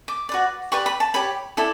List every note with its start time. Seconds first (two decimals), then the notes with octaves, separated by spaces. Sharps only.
0.08 D6
0.29 F#4 B4 D5
0.72 G4 B4 D5 C#6
0.86 B5
1.00 A5
1.14 G4 C#5 B5
1.57 E4 A4 D5